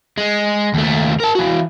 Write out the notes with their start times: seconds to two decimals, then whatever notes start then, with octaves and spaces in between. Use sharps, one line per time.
0.18 G#3
0.74 D#2 A3
1.20 A#4 A5
1.35 E3 F#4